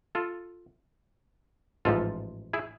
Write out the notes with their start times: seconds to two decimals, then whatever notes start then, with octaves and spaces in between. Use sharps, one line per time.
0.15 F4 A4
1.85 A1 G#2 F3 F4 A4
2.53 E4 G#4